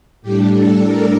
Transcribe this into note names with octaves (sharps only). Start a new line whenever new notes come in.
A2 G3 D4 G4
A4
A#4